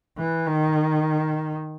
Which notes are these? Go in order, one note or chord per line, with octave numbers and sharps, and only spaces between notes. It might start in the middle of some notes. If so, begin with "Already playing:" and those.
E3
D#3